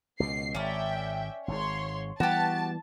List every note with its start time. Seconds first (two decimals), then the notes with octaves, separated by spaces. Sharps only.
0.20 C#2 B2 C7
0.55 G#1 C#4 D5 E5 G5
1.48 G#1 G#2 C#5 C6
2.20 E3 G3 B3 F#4 G4 A5